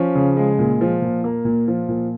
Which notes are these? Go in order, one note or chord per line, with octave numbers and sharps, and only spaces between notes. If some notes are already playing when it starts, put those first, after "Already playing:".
Already playing: F3 C#4
C#3
G#3
A#2
F3
A#2
A#3
A#2
F3
A#2